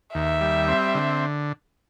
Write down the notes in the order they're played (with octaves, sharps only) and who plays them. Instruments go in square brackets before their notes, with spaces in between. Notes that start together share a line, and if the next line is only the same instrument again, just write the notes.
[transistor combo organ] D#2 [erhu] E5
[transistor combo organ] G3
C4
D3